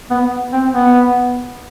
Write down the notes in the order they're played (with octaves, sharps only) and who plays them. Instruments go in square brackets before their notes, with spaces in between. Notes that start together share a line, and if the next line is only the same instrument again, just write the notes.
[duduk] B3
C4
B3